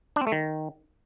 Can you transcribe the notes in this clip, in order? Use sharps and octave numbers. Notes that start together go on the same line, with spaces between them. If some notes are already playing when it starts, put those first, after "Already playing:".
D4
C4
A3
D#3